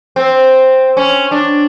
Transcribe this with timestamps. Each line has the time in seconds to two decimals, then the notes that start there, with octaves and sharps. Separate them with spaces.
0.16 C4
0.97 C#4
1.31 D4